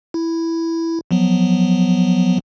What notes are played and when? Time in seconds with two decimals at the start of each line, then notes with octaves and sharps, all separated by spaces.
0.14 E4
1.11 F3 F#3 B3